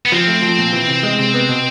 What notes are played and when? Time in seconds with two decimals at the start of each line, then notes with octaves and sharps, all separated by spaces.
0.05 B3
0.12 F3 C4
0.28 A3
0.42 F3
0.58 A#2
0.73 E3
0.88 C3
1.03 G#3
1.19 C3
1.34 B3
1.49 B2